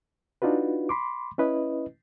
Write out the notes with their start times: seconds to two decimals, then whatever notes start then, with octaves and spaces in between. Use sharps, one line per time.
0.42 D4 D#4 F4 F#4 B4
0.89 B5 C6 D6
1.38 C#4 E4 B4 D#5